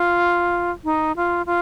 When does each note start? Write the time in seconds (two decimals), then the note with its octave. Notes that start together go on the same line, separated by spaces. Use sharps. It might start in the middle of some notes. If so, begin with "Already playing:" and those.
Already playing: F4
0.84 D#4
1.16 F4
1.46 F4